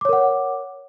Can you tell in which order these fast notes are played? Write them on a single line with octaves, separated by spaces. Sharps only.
D6 C#5 A#4 F#5